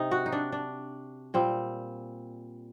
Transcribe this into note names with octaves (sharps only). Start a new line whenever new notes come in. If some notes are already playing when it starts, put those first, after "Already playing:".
Already playing: C3 D#4
F#4
D#4
D4
D4
A#2 G3 C4